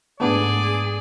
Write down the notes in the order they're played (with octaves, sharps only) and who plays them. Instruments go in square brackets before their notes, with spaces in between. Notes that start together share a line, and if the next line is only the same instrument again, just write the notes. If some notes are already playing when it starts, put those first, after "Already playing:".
[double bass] G#2 [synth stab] A3 B3 D4 [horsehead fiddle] G#4 [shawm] D5